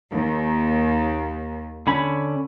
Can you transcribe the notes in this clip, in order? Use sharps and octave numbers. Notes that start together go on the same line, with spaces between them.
D#2
D3 C#4 B5